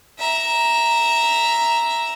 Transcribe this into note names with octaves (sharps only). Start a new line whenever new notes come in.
E5 A#5